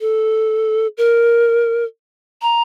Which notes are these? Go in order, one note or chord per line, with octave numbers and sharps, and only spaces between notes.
A4
A#4
A#5